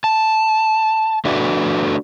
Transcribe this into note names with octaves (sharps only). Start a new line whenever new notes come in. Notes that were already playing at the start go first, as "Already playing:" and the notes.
A5
A3 D4 F#4 B4